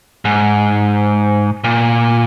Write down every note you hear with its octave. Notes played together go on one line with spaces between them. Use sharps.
G#2
A#2